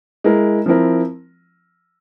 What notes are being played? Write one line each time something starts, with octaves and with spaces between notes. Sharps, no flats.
G#3 E4 A#4
F3 C4 E4 A#4